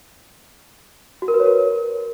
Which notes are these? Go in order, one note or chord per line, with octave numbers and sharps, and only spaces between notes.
F#4
A#4
B4
C#5
A#4